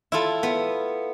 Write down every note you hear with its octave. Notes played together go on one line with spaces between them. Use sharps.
E4 F4 A4
B3